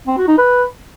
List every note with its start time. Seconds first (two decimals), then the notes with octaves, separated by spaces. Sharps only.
0.07 C4
0.17 F#4
0.28 D#4
0.38 B4